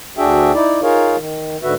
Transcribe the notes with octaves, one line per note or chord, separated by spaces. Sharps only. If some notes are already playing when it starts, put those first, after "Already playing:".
D2 D4 F#4 G#4 E5 G5
D#4 E4 D5
D#4 F4 G#4 A#4 C#5 F5
D#3
G#2 D3 F#4 B4 E5